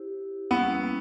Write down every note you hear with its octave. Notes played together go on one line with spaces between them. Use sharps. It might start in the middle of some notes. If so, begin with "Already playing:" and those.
Already playing: E4 G4 C5
G3 A#3 B3 C#4 E4